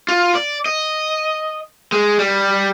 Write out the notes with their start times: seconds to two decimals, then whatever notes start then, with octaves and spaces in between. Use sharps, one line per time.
0.08 F4
0.35 D5
0.66 D#5
1.92 G#3
2.19 G3